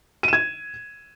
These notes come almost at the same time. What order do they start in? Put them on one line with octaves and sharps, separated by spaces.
D#7 E7 G#6